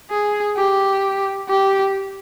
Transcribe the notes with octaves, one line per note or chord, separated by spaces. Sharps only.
G#4
G4
G4